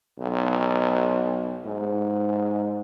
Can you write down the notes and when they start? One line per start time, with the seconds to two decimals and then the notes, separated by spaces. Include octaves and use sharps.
0.19 B1
1.65 G#2